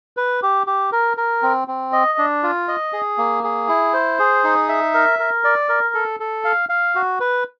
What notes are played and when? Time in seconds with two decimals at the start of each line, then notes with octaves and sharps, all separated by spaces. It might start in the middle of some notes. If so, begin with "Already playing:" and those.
0.17 B4
0.43 G4
0.67 G4
0.92 A#4
1.17 A#4
1.42 C4
1.68 C4
1.93 D#5
2.18 D4
2.43 F4
2.68 D#5
2.93 G#4
3.18 A#3
3.43 G#4
3.68 E4
3.93 C5
4.19 G#4
4.44 D#4
4.69 E5
4.94 A#4
5.19 A#4
5.44 D5
5.69 A#4
5.94 A4
6.20 A4
6.45 F5
6.69 F5
6.95 F#4
7.20 B4